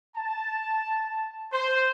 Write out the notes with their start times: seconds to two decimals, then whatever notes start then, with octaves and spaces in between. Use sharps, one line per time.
0.16 A5
1.52 C5